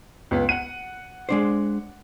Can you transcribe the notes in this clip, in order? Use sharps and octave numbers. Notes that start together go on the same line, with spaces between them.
C#2 B3
F#5 D#7
G#3 D4 C5